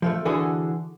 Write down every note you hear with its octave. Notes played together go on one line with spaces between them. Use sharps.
F3 G#3 A3
D3 E3 F#4 G#4 A4